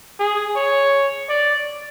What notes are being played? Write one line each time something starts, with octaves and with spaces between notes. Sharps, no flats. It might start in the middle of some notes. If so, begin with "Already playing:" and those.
G#4
C#5
D5